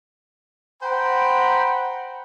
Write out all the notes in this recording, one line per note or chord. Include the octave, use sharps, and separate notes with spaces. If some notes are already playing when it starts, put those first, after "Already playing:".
C5 F#5 G5 A#5 B5